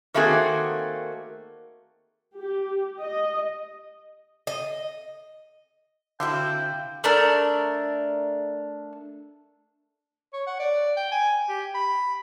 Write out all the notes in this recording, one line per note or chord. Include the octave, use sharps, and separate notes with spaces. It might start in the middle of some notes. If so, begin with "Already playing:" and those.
D#3 A3 A#3 C4 F#4 G#4
G4
D#5
D#5
D3 C4 E4 F#4 F5 G5
A3 D4 A#4
C#5
F#5
D5
G5
G#5
G4
B5